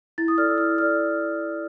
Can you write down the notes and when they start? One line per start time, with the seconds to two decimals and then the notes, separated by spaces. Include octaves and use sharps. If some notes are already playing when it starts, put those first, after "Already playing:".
0.18 E4 A6
0.28 D#6
0.38 A4 D5 F6
0.48 E6
0.58 E4 F6
0.78 A4 F6
0.82 D5